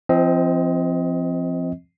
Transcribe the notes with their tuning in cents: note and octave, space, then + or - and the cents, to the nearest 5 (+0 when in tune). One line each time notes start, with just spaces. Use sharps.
F3 -35 C4 +0 D#5 +25